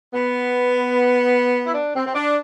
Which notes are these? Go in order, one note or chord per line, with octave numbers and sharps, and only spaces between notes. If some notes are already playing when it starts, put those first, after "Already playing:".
B3
E4
D4
C4
C4
D4